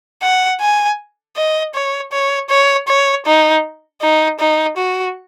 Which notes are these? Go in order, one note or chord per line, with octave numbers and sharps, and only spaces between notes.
F#5
G#5
D#5
C#5
C#5
C#5
C#5
D#4
D#4
D#4
F#4